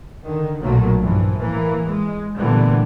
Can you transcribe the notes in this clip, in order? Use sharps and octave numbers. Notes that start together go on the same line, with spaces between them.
D3 D#3
B1 A#2 F#3 A3 A#3
G2 E3 F3
A2 E3 A#3
G#3
A#2 D3 E3 G3 A3 B3